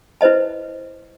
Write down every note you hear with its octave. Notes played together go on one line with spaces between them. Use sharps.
E4 B4 C5 D#5 A5